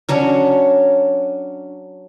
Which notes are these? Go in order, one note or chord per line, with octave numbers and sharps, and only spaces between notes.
F#3 C#4 D4 C#5